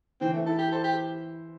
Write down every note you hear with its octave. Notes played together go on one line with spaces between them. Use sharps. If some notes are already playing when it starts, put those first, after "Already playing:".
E3 C4
A3
E4 A4
G4
A4 C5
G4